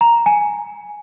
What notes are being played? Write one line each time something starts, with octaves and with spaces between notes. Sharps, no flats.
A#5
G#5